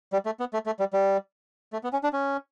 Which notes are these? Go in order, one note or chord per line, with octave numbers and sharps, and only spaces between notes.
G3
A3
B3
A3
A3
G3
G3
A3
B3
C#4
D4
C#4